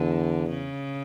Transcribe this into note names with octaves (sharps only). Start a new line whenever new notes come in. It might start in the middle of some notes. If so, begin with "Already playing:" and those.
Already playing: E2 D3
C#3